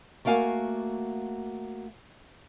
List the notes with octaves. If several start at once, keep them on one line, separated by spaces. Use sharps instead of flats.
A3 A#3 F#4 F5 G#5